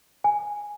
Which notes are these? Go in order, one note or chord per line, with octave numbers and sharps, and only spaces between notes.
G#5